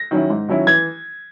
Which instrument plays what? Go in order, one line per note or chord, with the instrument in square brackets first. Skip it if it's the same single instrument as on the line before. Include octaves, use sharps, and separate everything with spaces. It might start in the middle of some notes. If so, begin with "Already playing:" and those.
Already playing: [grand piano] A#6
[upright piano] D#3 F#3 C#4 E4
G#2
D#3 F#3 C#4 E4
[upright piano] E3 [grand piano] G#6